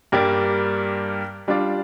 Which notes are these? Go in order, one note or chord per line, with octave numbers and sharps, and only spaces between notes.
G2 G3 A#3 G4 D5
G3 D4 F4 D5 F5